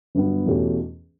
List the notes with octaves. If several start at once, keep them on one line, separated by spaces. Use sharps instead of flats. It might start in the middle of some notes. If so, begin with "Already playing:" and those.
G1 G2 F#3 B3
E2 B2 A3 C#4 G4